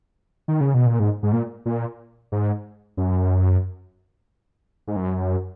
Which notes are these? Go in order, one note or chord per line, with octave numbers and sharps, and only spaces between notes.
D#3
C#3
B2
A#2
G#2
G#2
A#2
A#2
G#2
F#2
G#2
F#2